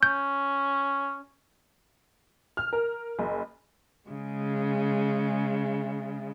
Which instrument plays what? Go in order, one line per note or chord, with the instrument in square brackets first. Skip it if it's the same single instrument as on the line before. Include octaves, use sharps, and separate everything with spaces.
[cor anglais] C#4 [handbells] G6
[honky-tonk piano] F6
A#4
F#1
[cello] C#3 G#3